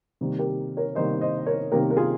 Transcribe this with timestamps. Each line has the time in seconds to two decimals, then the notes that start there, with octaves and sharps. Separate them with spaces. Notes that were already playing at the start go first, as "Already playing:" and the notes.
0.21 C3 D#3 G3 A#3
0.39 G4 A#4
0.77 A#4 C#5
0.95 C3 D#3 G3 A#3 C5 D#5
1.21 C5 D#5
1.46 A#4 C#5
1.72 C3 D#3 G3 A#3 G4 A#4
1.91 A#4
1.97 F4 G#4